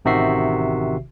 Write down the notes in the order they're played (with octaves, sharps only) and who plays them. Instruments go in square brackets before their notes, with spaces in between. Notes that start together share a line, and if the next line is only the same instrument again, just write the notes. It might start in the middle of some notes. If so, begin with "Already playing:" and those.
[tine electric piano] A1 C3 D#3 F#4 E5 C7